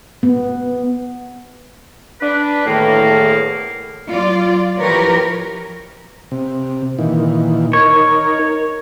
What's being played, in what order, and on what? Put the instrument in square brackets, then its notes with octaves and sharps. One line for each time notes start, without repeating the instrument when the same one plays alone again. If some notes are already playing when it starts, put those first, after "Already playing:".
[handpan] B3
[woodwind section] D4 B4
[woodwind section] E2 D#3 A#3 [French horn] A2
[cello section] F#3 F4 D5
E3 F3 G4 A#4 B4 C#5
[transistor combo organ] C3
A#2 D#3 E3
[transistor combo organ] D#4 A#4 [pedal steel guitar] C#5